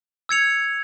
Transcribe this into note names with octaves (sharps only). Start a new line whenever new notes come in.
E6 G#6 C#7 F7